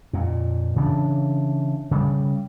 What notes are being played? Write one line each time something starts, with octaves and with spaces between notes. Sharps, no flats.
F2 A#2
C#3 E3 D4
C#3 G3